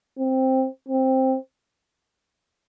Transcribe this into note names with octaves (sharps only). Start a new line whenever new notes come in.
C4
C4